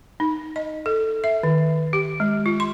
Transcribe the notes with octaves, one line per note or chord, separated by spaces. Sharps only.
D#4
D#5
A4
E5
D#3
G4
G#3
F4
C6